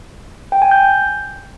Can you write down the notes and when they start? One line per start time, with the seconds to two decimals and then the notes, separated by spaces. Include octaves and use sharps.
0.52 G5
0.62 G#5
0.71 G6